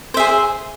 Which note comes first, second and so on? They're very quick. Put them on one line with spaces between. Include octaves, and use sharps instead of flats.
C5 E5 G#4